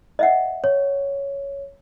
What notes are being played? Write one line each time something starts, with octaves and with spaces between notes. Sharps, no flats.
D#5 E5 F#5
C#5